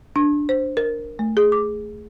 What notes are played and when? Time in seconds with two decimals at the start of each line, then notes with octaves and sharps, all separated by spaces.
0.16 D4
0.49 C5
0.77 A#4
1.19 A3
1.37 G#4
1.52 D6